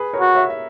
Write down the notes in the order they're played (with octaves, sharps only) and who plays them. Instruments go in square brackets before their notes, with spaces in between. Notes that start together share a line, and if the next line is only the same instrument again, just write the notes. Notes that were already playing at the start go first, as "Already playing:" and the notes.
Already playing: [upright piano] G#4 B4
A#4 C#5
[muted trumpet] F#4
[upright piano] C#5 E5
E5